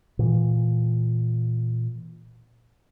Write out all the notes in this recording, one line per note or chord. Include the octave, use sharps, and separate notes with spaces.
A#2 E3